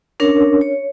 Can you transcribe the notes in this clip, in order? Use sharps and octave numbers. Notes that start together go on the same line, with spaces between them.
C#4 D4 A#4 C#5
C#5